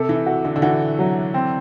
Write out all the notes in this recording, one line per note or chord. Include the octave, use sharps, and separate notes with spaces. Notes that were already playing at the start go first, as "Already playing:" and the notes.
Already playing: C3 A4
E3
F#4
D3
D3
E3 F#4
F#3
C4